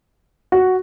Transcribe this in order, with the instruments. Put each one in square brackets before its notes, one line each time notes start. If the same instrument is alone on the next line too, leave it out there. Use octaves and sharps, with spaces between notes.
[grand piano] F#4